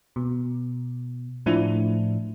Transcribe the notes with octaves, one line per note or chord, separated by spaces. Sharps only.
B2
A2 F3 D4 E4